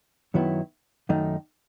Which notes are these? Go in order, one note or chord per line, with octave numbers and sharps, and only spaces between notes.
F#2 D#3 F#3 B3 E4
F#2 D#3 A3 D#4